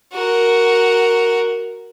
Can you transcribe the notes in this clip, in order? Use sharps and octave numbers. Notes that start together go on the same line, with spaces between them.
F#4 A#4